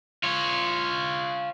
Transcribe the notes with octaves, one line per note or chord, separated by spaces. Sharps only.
F4 C#5